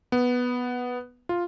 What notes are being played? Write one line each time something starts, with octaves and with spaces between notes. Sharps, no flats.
B3
F4